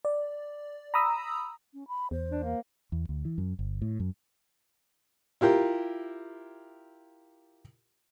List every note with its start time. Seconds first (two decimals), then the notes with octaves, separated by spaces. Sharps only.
0.05 D5
0.94 A#5 B5 D#6 E6
1.74 C#4
1.88 B5
2.11 E2 C5
2.31 D4
2.43 A#3
2.92 E2
3.09 D2
3.25 E3
3.38 F#2
3.59 G1
3.82 A2
4.00 F#2
5.41 E4 F4 G4 A#4